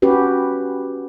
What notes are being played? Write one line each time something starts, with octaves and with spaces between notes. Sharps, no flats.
C#4 F#4 G4 B4